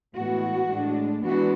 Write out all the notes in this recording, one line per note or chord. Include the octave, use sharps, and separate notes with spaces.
A2 E3 G#3 B3 F#4
A2 G#3 D4
E3 G#3 B3 D4 F#4